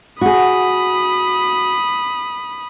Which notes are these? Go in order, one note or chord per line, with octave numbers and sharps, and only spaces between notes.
F#4 G#4 B5 D#6